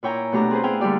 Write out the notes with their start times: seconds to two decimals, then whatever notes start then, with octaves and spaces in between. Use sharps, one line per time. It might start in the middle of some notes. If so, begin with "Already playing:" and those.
0.03 A#2 E4 C#5 G5 G#5 A#5
0.32 B2 A3 B3 D4 G4 A#5
0.51 C4 G#4 B4 C5
0.63 B3 E4 G#4 F5 G5 G#5
0.81 D3 G3 A#3 G4 D5